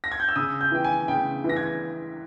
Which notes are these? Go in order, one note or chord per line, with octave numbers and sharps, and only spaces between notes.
A#6
G#6
G6
E6
C#3 D#6
G6
E3 G5
G#5
C#3 G5
E3
A#6
G#6